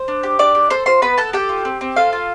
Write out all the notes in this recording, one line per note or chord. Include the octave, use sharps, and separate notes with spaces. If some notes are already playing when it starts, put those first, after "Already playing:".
Already playing: C5
D4
G4
D4 D5 D6
G4
A4 C5 C6
F4 C5 C6
B3 B4 B5
B3 A4 A5
G4 A4 G5
F4
C4
C4
F4 A4 F5
F4